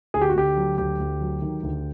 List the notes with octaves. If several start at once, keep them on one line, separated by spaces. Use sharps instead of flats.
D2 G#4
G4
F#4
D2 G4
F#3
D2 G4
D2
F#3
D#3
D2